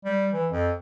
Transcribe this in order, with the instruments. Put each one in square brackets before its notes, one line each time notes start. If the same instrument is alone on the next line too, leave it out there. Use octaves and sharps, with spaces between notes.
[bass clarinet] G3
E3
F2